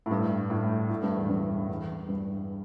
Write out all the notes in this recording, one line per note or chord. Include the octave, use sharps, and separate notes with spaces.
A2
G2
A2
A2
G2
E2
G2
E2
G2